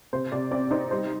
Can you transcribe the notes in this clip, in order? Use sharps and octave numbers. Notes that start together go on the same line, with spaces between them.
C3 C5
C3 D5
C4 D5
D#4 C5
G3 C5